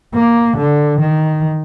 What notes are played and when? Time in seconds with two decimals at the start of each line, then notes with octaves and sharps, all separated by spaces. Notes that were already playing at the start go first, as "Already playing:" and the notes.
0.14 A#3
0.57 D3
1.00 D#3